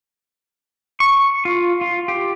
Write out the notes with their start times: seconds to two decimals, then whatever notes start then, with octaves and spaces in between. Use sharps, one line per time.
1.00 C#6
1.45 F4
1.81 F4
2.08 G4